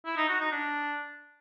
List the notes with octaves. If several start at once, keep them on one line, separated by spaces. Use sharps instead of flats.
E4
D#4
F#4
D#4
D4